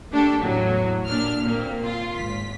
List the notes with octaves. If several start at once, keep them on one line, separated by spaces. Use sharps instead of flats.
A3 A#3 D4 G4 A4
E2 A2 F#3
A#2 D4 F6
A#2 A#3 C4
F4
G#1 B6